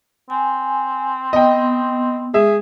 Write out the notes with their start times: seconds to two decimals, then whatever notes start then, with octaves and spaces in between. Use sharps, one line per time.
0.30 C4 G#5
1.33 B3 D#5 G5
2.34 G#3 G#4 E5